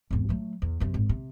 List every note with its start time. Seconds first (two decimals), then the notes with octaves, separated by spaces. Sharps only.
0.11 G#1 E2
0.29 F#3 A3
0.62 E2
0.80 F#2 C3
0.94 G#1
1.09 C3